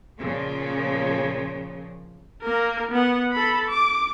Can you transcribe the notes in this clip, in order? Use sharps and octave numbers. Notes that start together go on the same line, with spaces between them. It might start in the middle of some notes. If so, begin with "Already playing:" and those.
A#2 C#3 F3
A#3 A#4
B3 F#5
A4 B5
D6